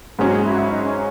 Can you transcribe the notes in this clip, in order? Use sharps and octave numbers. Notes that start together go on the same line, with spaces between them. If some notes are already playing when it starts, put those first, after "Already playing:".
G#2 F#3 C#4 G#4
F#4
G#4
E4
F#4
E4
D#4
C#4